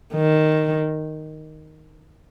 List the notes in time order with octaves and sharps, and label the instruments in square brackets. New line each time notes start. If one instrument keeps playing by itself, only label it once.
[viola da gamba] D#3